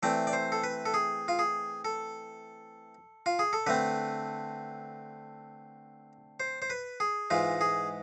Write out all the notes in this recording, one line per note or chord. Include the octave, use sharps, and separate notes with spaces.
E3 A3 C4 D5
D5
C5
A4
B4
A4
G#4
F4
G#4
A4
F4
G#4
A4
D3 A3 C4 B4
C5
C5
B4
G#4
G#2 E3 G#3 F4
G#4